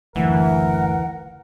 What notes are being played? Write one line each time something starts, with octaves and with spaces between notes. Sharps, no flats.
F#1 D2 E3 A#4 F#5